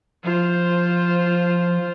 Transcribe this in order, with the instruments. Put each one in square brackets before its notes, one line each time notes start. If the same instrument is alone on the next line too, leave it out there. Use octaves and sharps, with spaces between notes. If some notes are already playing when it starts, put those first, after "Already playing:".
[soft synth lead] F3 [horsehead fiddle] F4 C5